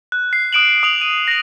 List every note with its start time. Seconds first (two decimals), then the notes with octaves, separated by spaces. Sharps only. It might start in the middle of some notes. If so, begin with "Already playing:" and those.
0.12 F#6
0.33 C7
0.53 D#6 F#6 D7 E7 F#7
0.83 D#6 F7 F#7
1.01 D#7
1.28 A#6 F7